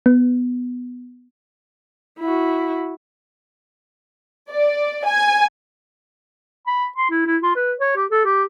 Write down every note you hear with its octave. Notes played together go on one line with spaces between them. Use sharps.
B3
E4 F#4
D5
G#5
B5
C6
E4
E4
F4
B4
C#5
G4
A4
G4